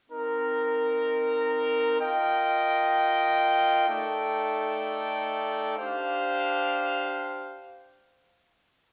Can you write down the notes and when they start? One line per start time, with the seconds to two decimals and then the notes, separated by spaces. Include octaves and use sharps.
0.10 C4 D#4 A#4
2.00 F4 A#4 D#5 G5
3.88 A3 D#4 A4 D5 G5
5.77 D4 G4 C5 F5